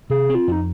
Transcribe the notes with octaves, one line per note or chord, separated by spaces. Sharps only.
C3 G#4
C4
F4
F2 D#4